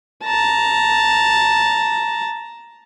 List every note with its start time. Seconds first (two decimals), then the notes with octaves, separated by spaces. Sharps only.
0.25 A5 A#5